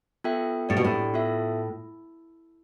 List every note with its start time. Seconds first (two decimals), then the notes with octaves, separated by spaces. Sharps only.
0.24 B3 F4 A4 E5 G5
0.69 A2 D4 G4 D5
0.77 B2
0.84 A2
1.14 B3 F4 A4 E5